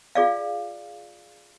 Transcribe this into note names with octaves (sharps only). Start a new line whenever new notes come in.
F4 G#4 D5 F5